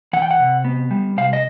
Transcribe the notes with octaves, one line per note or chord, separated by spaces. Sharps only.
E3 F#5
G5
F#5
C3
B3
G3
C3 F5
D#5